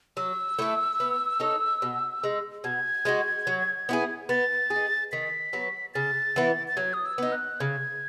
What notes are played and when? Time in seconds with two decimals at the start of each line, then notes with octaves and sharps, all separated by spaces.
0.17 F#3 E6
0.59 A3 E4 A4
1.00 B3
1.40 D#4 A4 C#5
1.82 B2
2.24 G#3 D#4
2.64 B2 G#6
3.05 G#3 D#4 F#4
3.47 F#3
3.89 B3 E4 G#4
4.29 B3 A6
4.70 G#4
4.76 D#4
5.12 D#3 B6
5.53 F#3 B3
5.94 C#3 A6
6.36 E3 B3 E4
6.68 A6
6.77 F#3 G#6
6.94 D#6
7.05 E6
7.18 B3 D#4
7.32 F#6
7.60 C#3 G#6